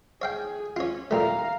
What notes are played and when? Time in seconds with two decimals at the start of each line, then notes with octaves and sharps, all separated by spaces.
0.22 G#4 C#5 F5 G5
0.76 C#4 F4 C#5
1.11 A#2 G3 A3 F5 A#5